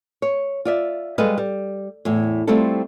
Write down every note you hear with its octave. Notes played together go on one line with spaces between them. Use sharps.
C#5
F4 D5 E5
G3 G#3 A4 B4 D#5 F5
G3
E2 A2
G3 A3 C4 E4 F4 A4